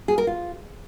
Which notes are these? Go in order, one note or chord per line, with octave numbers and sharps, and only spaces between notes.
G#4
A#4
F4